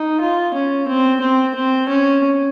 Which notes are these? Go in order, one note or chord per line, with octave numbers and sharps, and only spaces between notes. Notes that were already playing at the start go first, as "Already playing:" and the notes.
Already playing: D#4
F4
C#4
C4
C4
C4
C#4